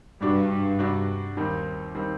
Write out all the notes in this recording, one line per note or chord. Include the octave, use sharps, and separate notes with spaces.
G2 C3 G3 D4 F#4
C3 G3 D4 F#4
D#2 D#3 G3 C4 D#4
D#3 G3 C4 D#4